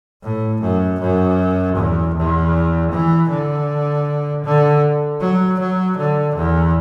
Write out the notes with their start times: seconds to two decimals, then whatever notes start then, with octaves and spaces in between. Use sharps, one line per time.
0.23 A2
0.61 F#2
1.00 F#2
1.76 E2
2.15 E2
2.91 E3
3.30 D3
4.44 D3
5.20 F#3
5.59 F#3
5.97 D3
6.36 E2